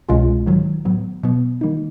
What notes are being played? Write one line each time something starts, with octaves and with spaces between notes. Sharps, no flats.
C2 B2 G#3 C#4 F4
G#2 D#3 F#3
A2 F#3 B3
B2 F#3 B3
D#3 G3 A#3 D#4